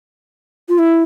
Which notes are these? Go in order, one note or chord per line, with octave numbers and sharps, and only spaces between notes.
F4
E4